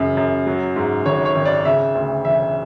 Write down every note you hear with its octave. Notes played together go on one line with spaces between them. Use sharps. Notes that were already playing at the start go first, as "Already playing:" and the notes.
Already playing: F#2 C#3 E3
F#2
F#3
G#2
G#1 C#5
C#5
G#1
D5
C#3 E5
D2
E1 E5